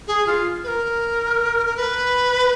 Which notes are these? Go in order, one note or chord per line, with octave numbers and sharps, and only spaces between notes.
G#4
F4
B4
A#4
A#4
B4